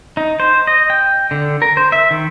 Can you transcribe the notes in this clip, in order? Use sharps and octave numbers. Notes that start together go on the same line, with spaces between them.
D#4
C5
D#5
G5
D3
A#4
C5
E5
D#3